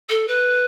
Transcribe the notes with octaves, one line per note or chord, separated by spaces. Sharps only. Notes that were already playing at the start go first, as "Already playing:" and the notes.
A4
B4